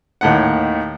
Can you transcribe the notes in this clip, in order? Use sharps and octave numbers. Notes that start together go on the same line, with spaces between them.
D#2 A2 F#5